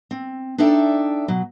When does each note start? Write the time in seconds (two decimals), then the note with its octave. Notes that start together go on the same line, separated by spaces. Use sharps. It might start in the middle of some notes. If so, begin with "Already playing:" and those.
0.11 C4
0.58 D4 D#4 A4 D5 E5 G5
1.28 B2 F#3